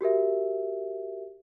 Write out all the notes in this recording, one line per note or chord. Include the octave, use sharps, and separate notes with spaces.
F#4 G4 A#4 E5